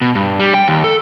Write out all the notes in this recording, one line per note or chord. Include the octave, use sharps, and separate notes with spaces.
B2
G2
G3
G5
D#2
A4